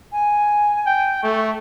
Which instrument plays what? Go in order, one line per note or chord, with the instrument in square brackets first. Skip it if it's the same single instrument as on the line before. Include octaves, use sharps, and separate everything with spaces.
[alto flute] G#5
[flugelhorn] G5
[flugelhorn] A3 [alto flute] C#6